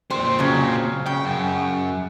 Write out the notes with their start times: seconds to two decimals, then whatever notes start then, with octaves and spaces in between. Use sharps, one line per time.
0.10 A#2 C4 C5
0.39 C#3 F#3
1.06 C#3 G5
1.25 F#2